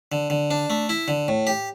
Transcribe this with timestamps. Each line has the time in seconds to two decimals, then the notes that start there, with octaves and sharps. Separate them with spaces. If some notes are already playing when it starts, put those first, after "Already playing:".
0.12 D3
0.30 D3
0.51 D4
0.70 A3
0.89 E4
1.08 D3
1.28 A2
1.47 G4